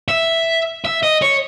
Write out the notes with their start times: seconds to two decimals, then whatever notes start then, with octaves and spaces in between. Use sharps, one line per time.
0.08 E5
0.85 E5
1.03 D#5
1.22 C#5